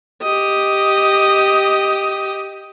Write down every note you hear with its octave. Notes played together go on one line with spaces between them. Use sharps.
G4 D#5